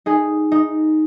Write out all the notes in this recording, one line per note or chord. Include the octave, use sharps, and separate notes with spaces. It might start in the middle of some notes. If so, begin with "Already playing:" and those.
D#4 G#4
D#4